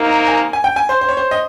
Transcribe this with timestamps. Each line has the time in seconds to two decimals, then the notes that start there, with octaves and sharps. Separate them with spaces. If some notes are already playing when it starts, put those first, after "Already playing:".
Already playing: C3 D#3 A#3 D#4 A#4
0.28 G#5
0.53 G#5
0.64 G5
0.76 G#5
0.89 C5
1.01 C5
1.09 C#5
1.17 C5
1.31 D#5